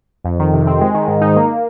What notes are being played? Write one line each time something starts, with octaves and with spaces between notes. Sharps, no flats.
F2
D#3
C3
C4
G#3
D#3
G#2
D#4
A#3